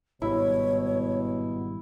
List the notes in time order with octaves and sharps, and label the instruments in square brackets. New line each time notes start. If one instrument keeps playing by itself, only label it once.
[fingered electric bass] G#1 G2 G3 [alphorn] B2 [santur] E4 [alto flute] C#5